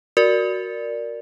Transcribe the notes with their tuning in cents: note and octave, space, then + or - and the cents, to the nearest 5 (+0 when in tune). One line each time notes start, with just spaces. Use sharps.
F#4 +0 A#4 +0 D5 +0